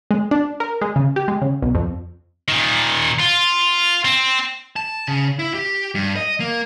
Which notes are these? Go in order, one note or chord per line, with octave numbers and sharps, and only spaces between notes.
G#3
D4
A#4
G#3
C#3
G4
G#3
C#3
B1
F2
A#2 D#3
F4
C4
A5
C#3
E4
G4
G2
D#5
A#3